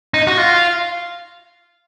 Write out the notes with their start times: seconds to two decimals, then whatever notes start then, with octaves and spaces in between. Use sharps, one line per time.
0.14 D#4
0.27 F#4
0.38 F4